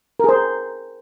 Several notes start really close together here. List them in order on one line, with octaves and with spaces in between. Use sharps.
A#4 G#4 C5